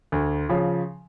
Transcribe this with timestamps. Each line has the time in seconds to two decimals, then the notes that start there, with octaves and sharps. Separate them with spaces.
0.12 D2
0.49 C#3 F3